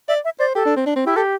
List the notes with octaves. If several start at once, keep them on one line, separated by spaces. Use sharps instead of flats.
D5 E5
E5
C5 D5
G4 A4
D4
C4
D4
C4
E4 G4
G4 A4